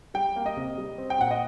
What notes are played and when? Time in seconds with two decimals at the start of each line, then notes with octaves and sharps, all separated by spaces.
0.14 G3 G5
0.36 A#3
0.46 D#5
0.57 C3
0.78 G3
0.98 C4
1.10 G5
1.18 A#2 F#5
1.31 D#5